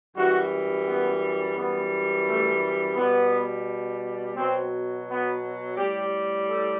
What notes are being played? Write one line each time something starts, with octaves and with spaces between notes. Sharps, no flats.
F#2 E3 G3 F#4
B3
F#2 E3 G3 B3
A3
B2 G3 B3
B2 F#3 C4
B3
A2 G3 G4
A4